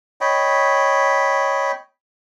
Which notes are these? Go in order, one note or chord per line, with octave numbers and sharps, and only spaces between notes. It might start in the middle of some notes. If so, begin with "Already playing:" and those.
C#5 D#5 G5 B5